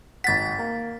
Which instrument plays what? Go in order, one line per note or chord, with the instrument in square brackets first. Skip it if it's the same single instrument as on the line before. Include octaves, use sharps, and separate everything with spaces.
[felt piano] G#1 F#5 [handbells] A6 B6
[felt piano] A#3